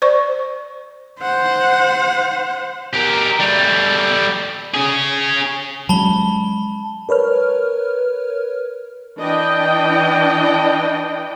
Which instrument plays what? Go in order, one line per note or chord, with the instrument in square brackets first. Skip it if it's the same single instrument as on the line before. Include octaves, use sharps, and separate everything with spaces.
[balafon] C5 D5 C#6
[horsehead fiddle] C5 F#5
[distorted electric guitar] G4 A#4
G3 A3
C#4 G#4
[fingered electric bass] F#3 G#3 C#4 [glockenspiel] A5 B5 G7
[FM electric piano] A#4 B4 C#5 F6
[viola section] E3 D4 D#5 G5